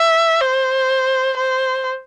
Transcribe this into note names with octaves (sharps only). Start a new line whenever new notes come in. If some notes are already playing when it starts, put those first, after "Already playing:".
Already playing: E5
C5
C5